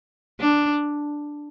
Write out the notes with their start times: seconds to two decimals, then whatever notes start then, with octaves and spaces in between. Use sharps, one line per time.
0.40 D4